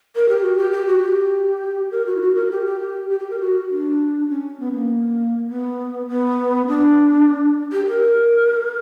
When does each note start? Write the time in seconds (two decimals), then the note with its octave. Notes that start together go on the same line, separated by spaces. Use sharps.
0.16 A#4
0.29 G4
0.42 F#4
0.57 G4
0.71 G4
0.87 F#4
1.01 G4
1.91 A#4
2.06 F#4
2.16 E4
2.21 F#4
2.35 A#4
2.51 G4
2.66 G4
2.81 G4
3.10 G4
3.20 G4
3.30 A#4
3.41 F#4
3.70 D4
4.30 C#4
4.60 B3
4.74 A#3
5.49 B3
6.09 B3
6.67 D4
7.72 G4
7.88 A#4